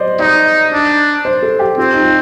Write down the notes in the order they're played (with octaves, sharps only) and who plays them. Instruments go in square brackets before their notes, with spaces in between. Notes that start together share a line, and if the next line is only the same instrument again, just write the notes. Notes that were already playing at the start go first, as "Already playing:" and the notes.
Already playing: [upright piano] C5 D5 D#5
[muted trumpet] D#4 [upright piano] D5
[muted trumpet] D4
[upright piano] C5
A4
G4
[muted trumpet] C4 [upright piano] F4
[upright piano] D#4
F4